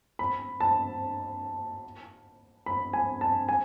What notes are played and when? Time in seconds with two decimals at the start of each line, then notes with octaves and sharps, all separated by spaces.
0.19 B5
0.60 A5
2.66 B5
2.93 G#5
3.21 A5
3.49 G#5